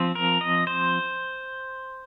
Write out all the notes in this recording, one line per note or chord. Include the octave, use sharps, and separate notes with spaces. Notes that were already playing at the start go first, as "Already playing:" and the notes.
Already playing: F3 C4
A#4
D#5
C5